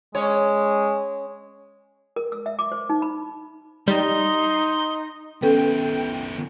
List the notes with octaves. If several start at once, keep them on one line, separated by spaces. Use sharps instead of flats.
G#3 C#4 C#5
A#4
E6
E5
D6
C5
D#4
B5
G3 D#4 C6
D#3 B3 C#4 A4 B4 G5